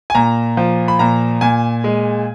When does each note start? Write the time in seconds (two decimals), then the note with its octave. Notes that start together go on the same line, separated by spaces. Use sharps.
0.10 G#5
0.15 A#2 A#5
0.57 F3
0.88 B5
0.99 A#2 A#5
1.41 A#2 G#5
1.84 G#3